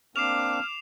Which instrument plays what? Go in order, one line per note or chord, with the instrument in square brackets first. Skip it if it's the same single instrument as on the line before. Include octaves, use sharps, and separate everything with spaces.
[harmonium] A#3 C4 D4 [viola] D6 [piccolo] F6 [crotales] C7 E7 F7